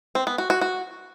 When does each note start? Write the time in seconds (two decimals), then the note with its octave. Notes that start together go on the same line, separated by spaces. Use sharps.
0.15 C4
0.27 B3
0.38 F#4
0.50 F#4
0.61 F#4